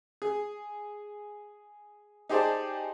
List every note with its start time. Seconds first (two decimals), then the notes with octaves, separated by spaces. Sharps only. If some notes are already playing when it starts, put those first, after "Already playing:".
0.22 G#4
2.30 D#4 G4 G#4 C5 D5 A5